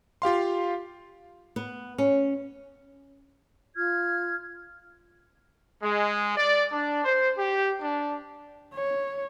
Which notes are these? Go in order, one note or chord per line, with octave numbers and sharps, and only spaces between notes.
F4 G4 F5 C6
B3
C#4
F4 F6 G#6
G#3
D5
D4
C5
G4
D4
C#5